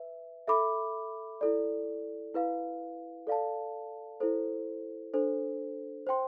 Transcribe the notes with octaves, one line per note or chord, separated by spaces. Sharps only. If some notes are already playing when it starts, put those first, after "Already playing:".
Already playing: B4 E5
A4 E5 B5 D6
E4 A4 D5
E4 B4 F5
A4 D5 F5 A5
E4 A4 C5
D4 A4 C5
C5 G5 C6